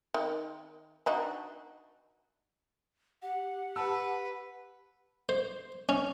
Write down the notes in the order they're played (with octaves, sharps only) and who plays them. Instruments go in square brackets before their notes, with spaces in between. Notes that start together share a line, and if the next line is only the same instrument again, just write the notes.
[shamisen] D#3
D4 D#4 F#4
[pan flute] G4 [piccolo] F#5
[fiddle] B4 [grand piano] A5 E6
[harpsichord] C5
C#4